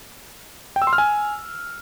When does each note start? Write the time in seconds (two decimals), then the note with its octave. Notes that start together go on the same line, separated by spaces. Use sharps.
0.76 G5
0.82 E6
0.87 C6
0.93 F6
0.98 G#5